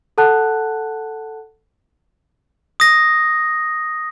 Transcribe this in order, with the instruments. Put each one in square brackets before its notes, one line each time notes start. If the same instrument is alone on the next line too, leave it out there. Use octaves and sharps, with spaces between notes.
[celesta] A4 F#5 A5 F#6
[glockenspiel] D#6 A#6